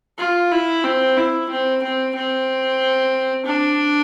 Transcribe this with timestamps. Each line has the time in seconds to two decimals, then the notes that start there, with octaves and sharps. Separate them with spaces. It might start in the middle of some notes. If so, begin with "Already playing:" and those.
0.18 F4
0.51 E4
0.84 C4
1.17 E4
1.50 C4
1.83 C4
2.15 C4
3.46 D4